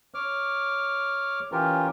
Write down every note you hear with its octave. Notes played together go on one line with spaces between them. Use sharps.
C#5 D6 F6
E3 C#4 F4 G4 A#4